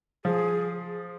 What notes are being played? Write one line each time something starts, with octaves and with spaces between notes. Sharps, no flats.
F3 G#4